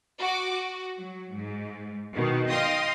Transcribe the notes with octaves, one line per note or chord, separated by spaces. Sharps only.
F#4 D6
F#4
F#3
G#2
B2 D#3
D#5 F5 G5 C6 D#6